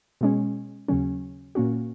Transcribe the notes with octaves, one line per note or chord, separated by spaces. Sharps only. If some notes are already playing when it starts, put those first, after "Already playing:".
B2 G#3 C#4
D#2 C#3 F#3 C#4
A#2 A#3 C#4 F#4